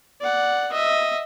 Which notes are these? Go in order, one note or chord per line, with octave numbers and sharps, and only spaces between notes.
D5 F#5
D#5 E5